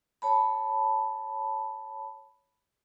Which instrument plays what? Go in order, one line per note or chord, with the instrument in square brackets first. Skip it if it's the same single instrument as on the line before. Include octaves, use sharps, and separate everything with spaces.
[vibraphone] C#5 A5 B5